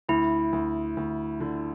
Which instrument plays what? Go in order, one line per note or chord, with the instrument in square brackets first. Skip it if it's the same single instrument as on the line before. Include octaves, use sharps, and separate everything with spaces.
[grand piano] D2 [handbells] E4
[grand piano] D2
D2
D3